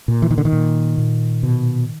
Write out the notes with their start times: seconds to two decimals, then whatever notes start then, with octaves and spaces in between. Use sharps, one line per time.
0.08 A#2
0.22 E3
0.31 D#3
0.38 D3
0.45 D#3
0.52 A#2
0.98 A#2
1.43 B2